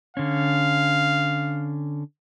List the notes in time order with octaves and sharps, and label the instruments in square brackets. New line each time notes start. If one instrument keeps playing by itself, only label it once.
[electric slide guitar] D3 C#4 [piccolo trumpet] F5